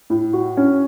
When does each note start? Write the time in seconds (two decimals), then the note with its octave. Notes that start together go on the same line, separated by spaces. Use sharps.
0.10 A2
0.33 F#4
0.57 C#4